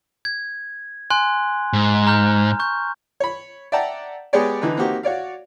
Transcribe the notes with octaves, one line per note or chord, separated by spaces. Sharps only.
G#6
G#5 C6 F#6
G#2
A#5 F6 G6
C#6 G6
C#5 B5
D5 E5 F#5 G5 A5 A#5
G#3 B3 G4 G#4 C#5 D5
D3 E3 D#4 B4
A#3 C4 D#4 F#4 G4
F#4 C#5 D5 F5